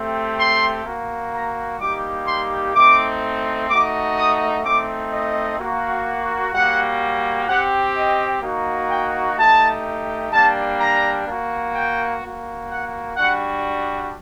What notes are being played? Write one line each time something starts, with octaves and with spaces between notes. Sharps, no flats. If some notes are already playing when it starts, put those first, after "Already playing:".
Already playing: A3 C4 G4
C6
A#3 F#4
A#5
G3 A#3 D#4 G4 D6
C6
A3 C4 D#4 D6
A3 D#4 F#4 D6
D#6
A3 C4 D#4 D6
D#5
A#3 F#4
G3 A#3 F#4 F#5
C4 G4 F#5
D#5
A#3 D#4 F#4
G5
A3 D#4 G4 A5
G3 A#3 D4 A5
A#5
A#3 F#4
G5
A#3 F#4
F#5
G3 D4 F#4 F#5